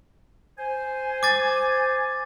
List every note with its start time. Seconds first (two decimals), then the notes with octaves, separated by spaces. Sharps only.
0.59 C5 G#5
1.23 D6 A6